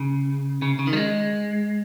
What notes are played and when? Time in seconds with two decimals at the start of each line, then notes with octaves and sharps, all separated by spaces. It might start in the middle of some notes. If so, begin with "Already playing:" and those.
Already playing: C#3
0.62 C#3
0.79 C#3
0.87 D#3
0.93 G3
0.96 G#3